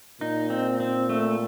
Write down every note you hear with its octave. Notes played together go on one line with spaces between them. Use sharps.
A#2 D#4
C4
C4
A3